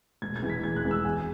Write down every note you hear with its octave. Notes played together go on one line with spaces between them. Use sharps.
E1 G#6
G#6
E2 E3 G#3
B6
E1 G#6
F#6
E2 E3 G#3
E6
E2 G#5